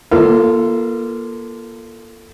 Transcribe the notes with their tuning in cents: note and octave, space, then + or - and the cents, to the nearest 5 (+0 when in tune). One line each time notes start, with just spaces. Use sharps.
A#3 +30 F4 -20 A4 +15